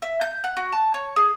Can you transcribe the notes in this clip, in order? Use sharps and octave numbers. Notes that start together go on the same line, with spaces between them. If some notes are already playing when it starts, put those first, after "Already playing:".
E5
G6
F#5
F#4
A5
C#5
G#4